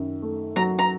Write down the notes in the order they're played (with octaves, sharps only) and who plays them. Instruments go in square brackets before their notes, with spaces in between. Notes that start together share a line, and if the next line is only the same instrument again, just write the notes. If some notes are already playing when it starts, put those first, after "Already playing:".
Already playing: [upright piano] F#2 D#3
A3
[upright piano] F#3 [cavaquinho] A#5
[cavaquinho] A#5